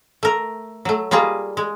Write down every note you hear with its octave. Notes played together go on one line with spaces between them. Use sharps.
A3 A#4
F#3 A3
G3 A#3 F4 G#4 D#5
G#3